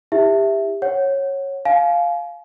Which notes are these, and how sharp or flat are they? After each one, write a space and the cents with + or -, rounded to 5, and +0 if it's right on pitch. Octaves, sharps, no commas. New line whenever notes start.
E4 -10 G4 +25 E5 +0
C#5 -15 F#5 +0
F5 +0 G#5 +40